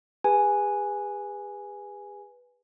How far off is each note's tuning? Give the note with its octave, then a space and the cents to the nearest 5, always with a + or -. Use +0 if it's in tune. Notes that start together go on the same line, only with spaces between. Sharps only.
G#4 -45 B4 -5 G#5 +0